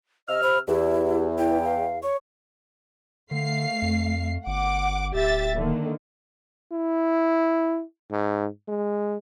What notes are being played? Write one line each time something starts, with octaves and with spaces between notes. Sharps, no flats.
C3 D#5 E6 F6
C5 B5
E2 E4 G4
E4 G5
F5
C#5 C#6
D3 A3 F5 C7
F2
G1 F#5 D6
D1 G4 E5 A6
D3 D#3 A#3
E4
G#2
G#3